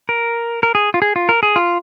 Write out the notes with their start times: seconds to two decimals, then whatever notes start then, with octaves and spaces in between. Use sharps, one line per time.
0.09 A#4
0.63 A#4
0.75 G#4
0.94 F4
1.02 G#4
1.16 F4
1.29 A#4
1.43 G#4
1.56 F4